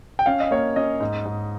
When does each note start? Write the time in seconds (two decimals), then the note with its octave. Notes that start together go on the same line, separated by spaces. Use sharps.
0.19 G5
0.26 C#4 F5
0.40 D#5
0.51 A#3 C#5
0.76 C#4 D#5
1.00 G#2
1.25 G#2